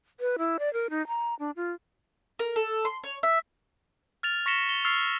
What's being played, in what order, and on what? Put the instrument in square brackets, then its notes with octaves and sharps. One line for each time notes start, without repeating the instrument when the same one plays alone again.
[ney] B4
E4
D5
A#4
D#4
A#5
D4
F4
[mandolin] A#4
A4
C6
C#5
E5
[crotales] F6 A6 F7
C#6 A#6 B6 C#7 E7 G7
G7
C#6 E6 F6 A6 C7 F7